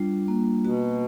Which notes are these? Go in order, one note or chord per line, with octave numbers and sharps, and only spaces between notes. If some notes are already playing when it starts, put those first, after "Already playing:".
Already playing: G3 D4 F4
A#3
B2 F#4